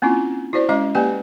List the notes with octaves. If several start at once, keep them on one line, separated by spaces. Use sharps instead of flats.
A#3 C4 C#4 E4 F4
E4 F#4 C5 D5
G#3 C#4 D#5 D6
A#3 G4 B4 D5 G5 G#5